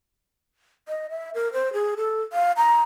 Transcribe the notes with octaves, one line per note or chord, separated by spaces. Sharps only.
D#5
E5
A#4
C5
G#4
A4
F5
A#5